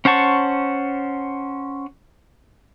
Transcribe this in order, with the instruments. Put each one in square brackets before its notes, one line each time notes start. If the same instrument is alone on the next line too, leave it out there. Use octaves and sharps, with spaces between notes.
[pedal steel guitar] C#4 C5 F#5 A5 C#6